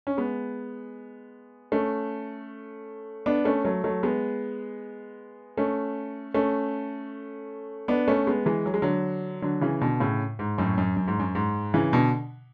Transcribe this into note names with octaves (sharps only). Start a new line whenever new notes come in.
C#4
G#3 B3
A3 C#4
B3 D4
A3 C#4
F#3 A3
F#3 A3
G#3 B3
A3 C#4
A3 C#4
B3 D4
A3 C#4
G#3 B3
E3 G#3
F#3
G#3
D3 F#3
D3 F#3
C#3 E3
B2 D3
A2 C#3
G#2
F#2 A2
F#2
F#2
G#2
F#2
G#2
C#3 E3
B2 D3